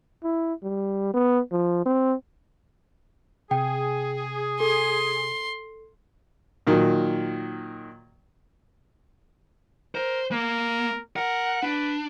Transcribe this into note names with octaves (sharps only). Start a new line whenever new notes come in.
E4
G3
B3
F3
C4
C3 G#4 G5
A4 C6
A#2 D#3 F#3
A#4 C5
A#3 A#4
A#4 F#5
D4 B4